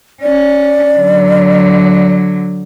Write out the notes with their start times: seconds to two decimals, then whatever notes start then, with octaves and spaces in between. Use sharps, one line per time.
0.22 C#4 D5
0.96 D3 F#3